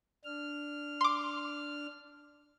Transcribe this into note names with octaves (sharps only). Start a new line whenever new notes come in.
D4 F6
C6 D6